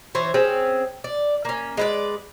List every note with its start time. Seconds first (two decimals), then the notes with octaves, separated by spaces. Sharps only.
0.15 E3 C5 C#5
0.34 C4 C#4 G#4
1.04 D5
1.45 A#3 C#4
1.77 G#3 B4 D5